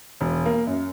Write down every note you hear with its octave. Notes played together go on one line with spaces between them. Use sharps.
E1
A#3
F#2